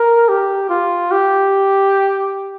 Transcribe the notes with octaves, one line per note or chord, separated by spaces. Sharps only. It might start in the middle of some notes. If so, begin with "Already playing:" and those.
Already playing: A#4
G4
F4
G4